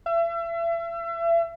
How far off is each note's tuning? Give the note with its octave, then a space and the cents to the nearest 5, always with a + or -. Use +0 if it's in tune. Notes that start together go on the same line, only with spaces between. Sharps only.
E5 +35